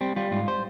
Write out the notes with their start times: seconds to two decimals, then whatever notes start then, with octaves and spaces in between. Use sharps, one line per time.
0.01 G3 C4
0.16 G3 F4
0.31 G#2 F4
0.48 C5